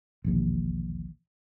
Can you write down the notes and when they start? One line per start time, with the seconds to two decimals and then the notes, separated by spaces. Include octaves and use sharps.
0.24 E1 A#1 D#2